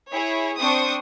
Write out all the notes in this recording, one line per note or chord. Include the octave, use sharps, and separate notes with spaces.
E4 G#4 C#5
C4 D4 C5 C#6 D#6